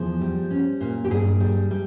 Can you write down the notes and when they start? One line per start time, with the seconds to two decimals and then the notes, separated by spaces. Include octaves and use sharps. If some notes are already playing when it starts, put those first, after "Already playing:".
Already playing: E2 F3 G#4
0.21 G3
0.51 C#4
0.81 A#2
1.05 G4
1.11 G2 G#4
1.40 G3
1.71 G3